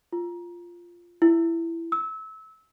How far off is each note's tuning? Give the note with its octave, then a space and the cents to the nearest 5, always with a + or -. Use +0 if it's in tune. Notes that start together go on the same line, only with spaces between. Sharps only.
F4 -5
E4 +15
E6 -25